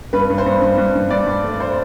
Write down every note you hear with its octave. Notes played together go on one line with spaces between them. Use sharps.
G2 B4
G2
C5
G2
G2
G2
G2
G2 D5
G2
A3
C5